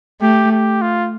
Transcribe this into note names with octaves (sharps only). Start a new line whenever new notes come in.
A3 G4
G4
F4